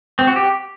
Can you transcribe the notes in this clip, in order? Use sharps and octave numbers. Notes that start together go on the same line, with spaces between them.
C4
F#4
G4